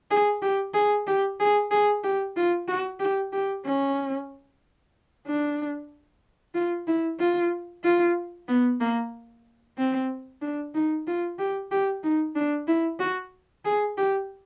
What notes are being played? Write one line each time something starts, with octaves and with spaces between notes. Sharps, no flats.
G#4
G4
G#4
G4
G#4
G#4
G4
F4
F#4
G4
G4
C#4
D4
F4
E4
F4
F4
B3
A#3
C4
D4
D#4
F4
G4
G4
D#4
D4
E4
F#4
G#4
G4